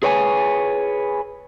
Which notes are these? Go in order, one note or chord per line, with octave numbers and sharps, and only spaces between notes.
G#4 B4 C#5 G5 G#5